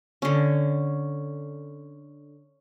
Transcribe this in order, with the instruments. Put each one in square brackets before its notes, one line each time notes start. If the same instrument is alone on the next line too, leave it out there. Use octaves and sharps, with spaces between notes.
[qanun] D3 C#4